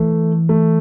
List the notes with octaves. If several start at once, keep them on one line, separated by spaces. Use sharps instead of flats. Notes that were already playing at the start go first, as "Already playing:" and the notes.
Already playing: E3 A3
A3